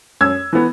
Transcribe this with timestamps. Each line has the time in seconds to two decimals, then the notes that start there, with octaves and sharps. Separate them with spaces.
0.21 F#2 E6 G#6
0.53 E3 B3